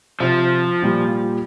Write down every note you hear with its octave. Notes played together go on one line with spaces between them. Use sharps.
C3 F3
A#2 G3